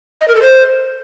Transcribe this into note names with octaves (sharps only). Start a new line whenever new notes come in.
D#5
A#4
A4
C5